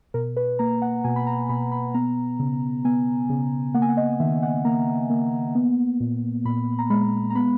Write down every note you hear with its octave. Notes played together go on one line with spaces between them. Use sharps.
B2 A#4
B4
A#3 A#5
F#5
B2 G#5
B5
A#5
B2 B5
B5
B3 A#5
C#3
B3 G#5
C#3
A#3 F#5
G#5
F#5
D#5
D#3 E5
F#5
A#3 A#5
A#3
B3
A#2
A#2 B5
A#5
G#3 B5
A#5
B3 B5